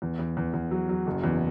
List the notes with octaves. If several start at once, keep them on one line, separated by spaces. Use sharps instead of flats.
E2
E2
E2
E2
F#3
F#3
F#1
E2